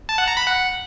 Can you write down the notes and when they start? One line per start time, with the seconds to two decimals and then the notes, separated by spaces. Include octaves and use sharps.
0.09 A5
0.18 F#5
0.28 A#5
0.37 B5
0.46 F#5